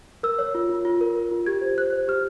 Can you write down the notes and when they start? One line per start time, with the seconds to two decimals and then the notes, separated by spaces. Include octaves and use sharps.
0.23 A#4 E6
0.39 C#5
0.55 F4
0.69 F4
0.85 F4
1.01 A#4
1.16 A#4
1.31 F4
1.46 G4 G#6
1.61 C5
1.77 C5 F#6
1.93 C5
2.08 G4 F6